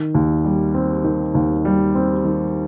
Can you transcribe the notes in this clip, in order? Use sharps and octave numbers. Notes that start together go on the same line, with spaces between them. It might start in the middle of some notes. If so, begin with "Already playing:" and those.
Already playing: D#3
D#2
G3
C4
D#3
D#2
G3
C4
D#3